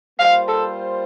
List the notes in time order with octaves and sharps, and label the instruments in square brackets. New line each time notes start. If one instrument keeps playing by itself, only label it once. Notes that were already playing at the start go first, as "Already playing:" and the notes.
[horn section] G3 A#3 F4 C5 [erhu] F5
[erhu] A4